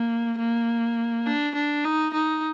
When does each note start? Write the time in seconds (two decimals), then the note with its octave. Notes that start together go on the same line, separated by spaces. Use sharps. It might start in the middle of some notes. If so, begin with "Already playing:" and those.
Already playing: A#3
0.39 A#3
1.26 D4
1.54 D4
1.84 D#4
2.13 D#4